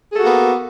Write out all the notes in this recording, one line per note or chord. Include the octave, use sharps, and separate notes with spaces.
A#3 B3 F#4 G#4 A4